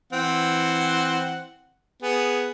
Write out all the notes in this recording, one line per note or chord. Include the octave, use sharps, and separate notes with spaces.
E3 C4 F#5
B3 G#4